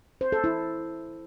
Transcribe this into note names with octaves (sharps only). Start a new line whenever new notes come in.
C5
A4
E4